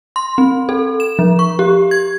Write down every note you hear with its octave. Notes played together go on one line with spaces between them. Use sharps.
C6
C4
A4
E7
F3
C#6
G4
G#6